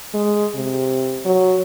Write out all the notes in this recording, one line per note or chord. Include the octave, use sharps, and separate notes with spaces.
G#3
C3
F#3